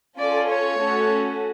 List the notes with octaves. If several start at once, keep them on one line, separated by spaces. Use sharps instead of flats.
C#4 F4 A4 D5
C#5
A3 C#4 F#4 A4